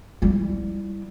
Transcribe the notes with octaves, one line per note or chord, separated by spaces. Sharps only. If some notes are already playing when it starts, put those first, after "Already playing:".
G3 E4